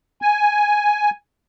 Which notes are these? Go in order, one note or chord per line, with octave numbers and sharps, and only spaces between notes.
G#5